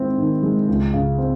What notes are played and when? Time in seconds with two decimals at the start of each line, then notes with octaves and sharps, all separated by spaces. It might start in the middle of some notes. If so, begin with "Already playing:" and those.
Already playing: D#3 G#3 C4 E4
0.18 D#3
0.43 G#3
0.68 C#2
0.94 C#3
1.18 C4